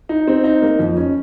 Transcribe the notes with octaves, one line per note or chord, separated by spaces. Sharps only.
D#4
C4
D#4
A#3
F2
C#4